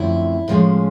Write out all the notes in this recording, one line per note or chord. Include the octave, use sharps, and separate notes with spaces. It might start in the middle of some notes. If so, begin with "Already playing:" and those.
Already playing: F#2 D3 F3 A3 C4 E4
A2 F3 G#3 C#4